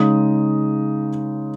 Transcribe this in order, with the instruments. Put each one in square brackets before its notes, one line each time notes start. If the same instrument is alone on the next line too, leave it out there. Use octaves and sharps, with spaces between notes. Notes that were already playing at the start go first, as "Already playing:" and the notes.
Already playing: [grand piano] C#3 G#3 D#4 D#6